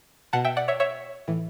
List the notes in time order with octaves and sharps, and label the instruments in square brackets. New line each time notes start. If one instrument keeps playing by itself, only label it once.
[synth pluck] B2 F#5 A5
E5 G5
D5 F#5
C#5 E5
C#5 E5
A2 E3